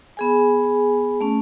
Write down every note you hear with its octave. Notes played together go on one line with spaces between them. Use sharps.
B3 G#4 G#5
A3 C#4